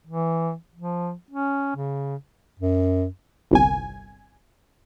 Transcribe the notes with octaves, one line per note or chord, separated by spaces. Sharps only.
E3
F3
C#4
C#3
F#2
G1 C2 G#5